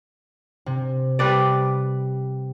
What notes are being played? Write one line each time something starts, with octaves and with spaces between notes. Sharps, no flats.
C3
G3 B4 D5